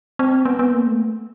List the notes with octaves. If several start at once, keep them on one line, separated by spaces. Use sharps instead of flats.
C4
B3
B3
A#3
A3